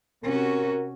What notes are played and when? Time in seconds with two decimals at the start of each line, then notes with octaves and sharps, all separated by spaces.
0.24 C3 C#4 F#4 A#4